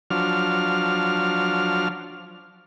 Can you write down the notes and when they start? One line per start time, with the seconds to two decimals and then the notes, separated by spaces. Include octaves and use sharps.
0.10 F3 F#3 D4 F6